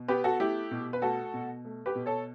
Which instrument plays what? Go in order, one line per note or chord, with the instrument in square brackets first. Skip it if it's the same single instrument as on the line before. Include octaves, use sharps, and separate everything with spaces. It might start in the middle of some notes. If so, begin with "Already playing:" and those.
Already playing: [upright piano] B2
B3 G4 B4
F#4 A4
A3 E4 G4
B2
B4
A3 F#4 A4
B2
A3
G4 B4
B2
A4 C#5